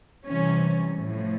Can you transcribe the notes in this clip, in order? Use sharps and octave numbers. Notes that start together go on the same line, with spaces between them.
C3 E3 G3 C#4
A2 F3